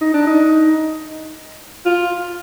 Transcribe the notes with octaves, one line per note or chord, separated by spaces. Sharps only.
D#4
D4
D#4
F4